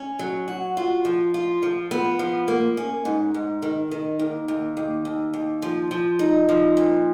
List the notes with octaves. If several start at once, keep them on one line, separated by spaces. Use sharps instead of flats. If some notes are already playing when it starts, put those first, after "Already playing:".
Already playing: C#4
F#3
F#4
F4
F3
F4
F3
B3
F3
A#3
C#4
G#2
G#2
D#3
D#3
D#2
D#2
D#2
D#2
D#2
F3
F3
D#4
F3
A#2